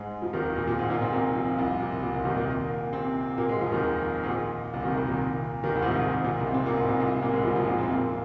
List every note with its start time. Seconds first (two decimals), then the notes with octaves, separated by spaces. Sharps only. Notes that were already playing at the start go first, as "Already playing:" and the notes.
Already playing: G#2 G#3
0.22 F2 F3
0.33 D#2 D#3
0.56 A#2
0.67 A#2
0.79 G#2
0.90 A#2 A#3
1.01 C3 C4
1.12 A#2 A#3
1.35 F2 F3
1.57 C2 C3
1.80 A#2
2.03 A#2
2.14 C2 C3
2.25 D#2 D#3
2.37 A#2 A#3
2.93 C3 C4
3.38 A#2 A#3
3.49 G#2 G#3
3.61 F2 F3
3.72 D#2 D#3
4.23 G#2
4.28 A#2
4.73 C2 C3
4.85 D#2 D#3
4.96 C2 C3
5.08 A#2
5.63 D#2 D#3
5.75 C2 C3
5.82 G#2
5.87 A#2
5.98 G#2
6.09 G#2
6.24 A#2
6.39 C2 C3
6.54 C3 C4
6.66 A#2 A#3
6.76 G#2
6.88 A#2
6.99 C2 C3
7.22 A#2 A#3
7.33 G#2 G#3
7.44 F2 F3
7.55 F2 F3
7.67 A#2 A#3
7.78 C3 C4
7.90 A#2 A#3